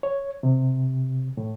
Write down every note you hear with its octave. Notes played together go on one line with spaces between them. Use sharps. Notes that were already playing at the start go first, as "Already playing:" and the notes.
C#5
C3
A2